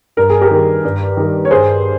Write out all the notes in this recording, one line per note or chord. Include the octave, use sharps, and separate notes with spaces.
G2 A#4
G#4
G4 A#4
D#3 G3
G2
D#3 G3
C#5
G2 G#4 C5